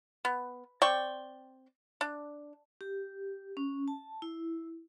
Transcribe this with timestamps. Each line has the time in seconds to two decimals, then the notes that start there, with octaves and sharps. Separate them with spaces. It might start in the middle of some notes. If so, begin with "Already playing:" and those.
0.25 B3
0.82 C4 D5 G5 C#6
2.01 D4
2.81 G4
3.57 C#4
3.88 A5
4.22 E4